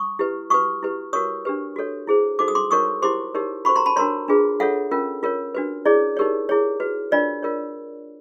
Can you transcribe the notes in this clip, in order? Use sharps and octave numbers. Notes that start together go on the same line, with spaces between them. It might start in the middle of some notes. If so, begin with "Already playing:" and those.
Already playing: C#6 D#6
E4 G4 B4
F#4 B4 C#6 D#6
E4 G4 B4
F#4 A#4 C#5 C#6 D#6
D4 G4 B4
F#4 A4 C#5
E4 G#4 C5
D#4 F#4 A4 C5 D6
D#6
C6 D6
D#4 F#4 A#4 C#5 C#6 D#6
E4 G4 C5 C6 D6
D#4 G4 A#4 C#5
F#4 A4 C5 B5 C#6
A#5 C6
A5 B5
D4 F#4 A#4 C#5 A#5 C6
D4 F4 G#4 B4
F4 A4 C#5 E5 F#5
C#4 F4 A#4
F4 A#4 C#5
D4 F#4 B4
E4 G#4 C#5 D5
D#4 G4 A#4 C#5
E4 G#4 C#5
F#4 B4
D4 F4 A#4 C#5 D5
F4 A#4 C#5